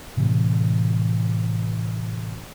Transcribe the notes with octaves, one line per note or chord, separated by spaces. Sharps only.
A2 C3 E3 G#3